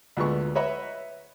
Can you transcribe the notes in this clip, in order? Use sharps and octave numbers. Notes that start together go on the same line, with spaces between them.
D2 A#2 G#3 A3 B3 C#6
B4 C#5 D#5 E5 F#5 B5